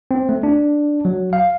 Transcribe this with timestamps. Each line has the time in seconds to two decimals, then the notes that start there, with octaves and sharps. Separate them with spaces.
0.11 C4
0.29 A3
0.43 D4
1.05 F#3
1.33 F5